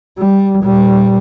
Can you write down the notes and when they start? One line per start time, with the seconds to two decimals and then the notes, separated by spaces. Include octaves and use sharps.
0.18 G3
0.61 A#2 G3